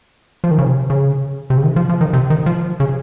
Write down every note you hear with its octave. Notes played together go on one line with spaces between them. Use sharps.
F3
D#3
C#3
C3
C#3
C3
C#3
D#3
F3
F3
D#3
C3
D#3
F3
C#3